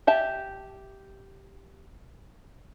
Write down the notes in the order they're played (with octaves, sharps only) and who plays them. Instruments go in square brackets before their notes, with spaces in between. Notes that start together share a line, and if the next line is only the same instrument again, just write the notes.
[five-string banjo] G4 E5 A5